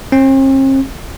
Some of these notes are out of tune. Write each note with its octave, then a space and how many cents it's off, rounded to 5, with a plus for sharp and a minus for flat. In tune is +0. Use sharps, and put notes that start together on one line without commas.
C4 +45